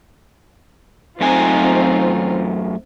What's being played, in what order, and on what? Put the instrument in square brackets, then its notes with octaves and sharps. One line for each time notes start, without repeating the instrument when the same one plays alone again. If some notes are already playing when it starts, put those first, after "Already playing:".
[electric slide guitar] F#2 A3 G#5 [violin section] C4 D#4 F4